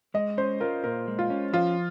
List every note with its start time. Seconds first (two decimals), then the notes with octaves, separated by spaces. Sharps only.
0.14 G#3 D#5
0.37 C#4 C5
0.60 F4 A#4
0.84 A#2 A#4
1.08 G#3
1.19 F4
1.30 C#4
1.53 F3 F4